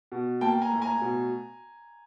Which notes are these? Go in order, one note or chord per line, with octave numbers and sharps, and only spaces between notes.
B2
A#3 G5 A5
G#5 A#5
A2
G#5 A#5
B2